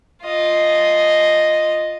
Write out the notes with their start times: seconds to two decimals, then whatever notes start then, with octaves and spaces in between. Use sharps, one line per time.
0.24 F4 D#5